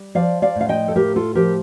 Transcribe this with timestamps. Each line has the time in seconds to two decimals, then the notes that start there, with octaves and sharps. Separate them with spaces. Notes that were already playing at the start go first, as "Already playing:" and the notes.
Already playing: G3
0.15 F3 D5 F5
0.42 D5 F5
0.55 A2
0.61 F5
0.69 D#5 G5
0.88 A4
0.96 A2 G4 A#4
1.16 F4 A4
1.35 F3 G4 A#4